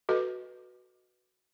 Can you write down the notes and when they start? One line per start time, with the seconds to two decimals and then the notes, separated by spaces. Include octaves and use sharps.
0.09 F#4 A4 B4 D#5